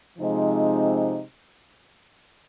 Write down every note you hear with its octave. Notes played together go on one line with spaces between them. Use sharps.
C3 F3 G#3 C4 D#4